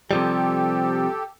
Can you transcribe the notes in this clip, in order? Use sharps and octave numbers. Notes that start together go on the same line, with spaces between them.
C3 F3 G3 G4 A4